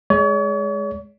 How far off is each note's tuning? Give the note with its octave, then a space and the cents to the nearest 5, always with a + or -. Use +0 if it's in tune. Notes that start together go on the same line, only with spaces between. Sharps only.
G#3 +5 C#5 +40